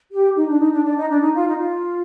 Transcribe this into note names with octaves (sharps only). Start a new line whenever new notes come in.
G4
D#4
D4
D#4
D4
D4
D#4
D4
D#4
F4
D#4
F4